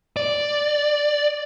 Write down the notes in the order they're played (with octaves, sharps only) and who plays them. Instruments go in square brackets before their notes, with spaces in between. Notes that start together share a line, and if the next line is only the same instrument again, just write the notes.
[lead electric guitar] D5